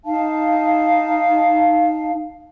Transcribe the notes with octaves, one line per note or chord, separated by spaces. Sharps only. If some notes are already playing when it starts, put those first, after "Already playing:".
D#4 F5 A5